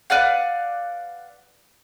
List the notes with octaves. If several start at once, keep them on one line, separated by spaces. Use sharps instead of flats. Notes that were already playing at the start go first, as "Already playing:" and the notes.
B4 D5 F5 F#5